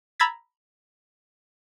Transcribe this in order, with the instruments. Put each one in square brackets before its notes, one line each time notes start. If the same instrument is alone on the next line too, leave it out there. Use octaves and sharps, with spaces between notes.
[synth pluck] A#5 B5 E6 G#6 A6 B6